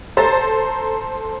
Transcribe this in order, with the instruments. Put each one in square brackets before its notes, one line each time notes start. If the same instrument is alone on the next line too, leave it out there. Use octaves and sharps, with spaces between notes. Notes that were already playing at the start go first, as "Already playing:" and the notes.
[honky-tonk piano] A4 C5 A#5 A6